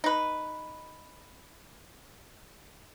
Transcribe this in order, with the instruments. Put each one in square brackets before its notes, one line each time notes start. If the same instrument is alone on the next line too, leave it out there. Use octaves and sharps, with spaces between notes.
[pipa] D#4 B4